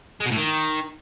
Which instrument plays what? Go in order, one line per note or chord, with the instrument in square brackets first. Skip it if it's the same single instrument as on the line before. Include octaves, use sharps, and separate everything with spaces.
[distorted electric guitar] G#3
B2
A2
D#3